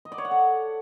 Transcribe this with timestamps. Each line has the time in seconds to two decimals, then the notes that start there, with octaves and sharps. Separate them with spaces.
0.05 D#5
0.12 D5
0.18 C#5
0.25 F#5
0.31 A4